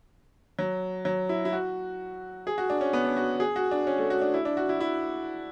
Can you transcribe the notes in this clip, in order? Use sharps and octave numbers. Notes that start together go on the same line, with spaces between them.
F#3
F#3
E4
E4
F#4
G#4
F#4
D4
C#4
B3
D4
F#4
G#4
F#4
D4
C#4
A3
F#4
D4
E4
D4
F#4
E4
E4